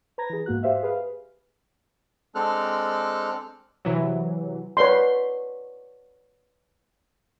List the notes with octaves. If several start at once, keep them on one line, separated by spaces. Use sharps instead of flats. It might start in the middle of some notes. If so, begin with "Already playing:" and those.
B4 A#5 G#6 A#6
E3 G#4
G#2 A#3 F#4 F#6
G4 C5 E5 F5
G#4 B4 F5
G#3 C4 D4 A4 F6 F#6
C3 E3 F#3
B4 C#5 D5 C6